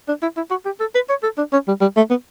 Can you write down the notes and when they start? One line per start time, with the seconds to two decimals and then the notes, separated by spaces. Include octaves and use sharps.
0.08 D4
0.22 E4
0.37 E4
0.51 F#4
0.65 G4
0.80 A4
0.95 B4
1.09 C#5
1.23 A4
1.38 D4
1.52 C#4
1.68 G3
1.81 G3
1.97 A3
2.10 B3